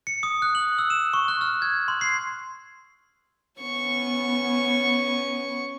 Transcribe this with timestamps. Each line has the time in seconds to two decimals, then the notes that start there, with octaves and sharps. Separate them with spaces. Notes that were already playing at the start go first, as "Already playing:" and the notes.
0.07 C#7
0.23 D#6
0.42 F#6
0.55 F#7
0.79 E6
0.90 E7
1.14 C#6
1.28 F#6
1.41 F6
1.62 G#6
1.88 C6
2.01 C7
3.61 B3 C#4 C#6